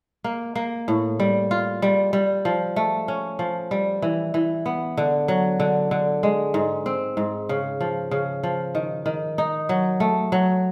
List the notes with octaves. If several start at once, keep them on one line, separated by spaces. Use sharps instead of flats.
A#3
A#3
A2
G3
F4
G3
G3
F3
A3
C#4
F3
G3
E3
E3
B3
D3
F#3
D3
D3
G#3
G#2
C4
G#2
C#3
F3
C#3
F3
D#3
D#3
D#4
F#3
A3
F#3